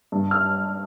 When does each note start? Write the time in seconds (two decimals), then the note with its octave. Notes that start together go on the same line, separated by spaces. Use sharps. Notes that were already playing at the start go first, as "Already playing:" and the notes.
0.12 G2
0.31 F6